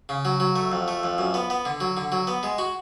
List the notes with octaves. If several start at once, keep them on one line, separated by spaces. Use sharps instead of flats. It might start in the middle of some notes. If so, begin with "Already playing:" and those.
C#3
F#3
F#3
A3
F2
A3
F2
F#2
B3
B3
D3
F#3
D3
F#3
B3
G#3
F#4